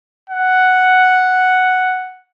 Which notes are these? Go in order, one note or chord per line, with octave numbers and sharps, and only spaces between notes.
F#5